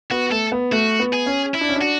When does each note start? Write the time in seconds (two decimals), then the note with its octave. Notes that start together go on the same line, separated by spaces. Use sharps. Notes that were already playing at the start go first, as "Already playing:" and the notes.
0.11 B3 F#4
0.31 A3 A4
0.52 B3
0.72 A3 F#4
1.00 B3
1.13 G#4
1.26 C#4
1.54 E4
1.61 D4
1.69 C#4
1.76 D4
1.81 F#4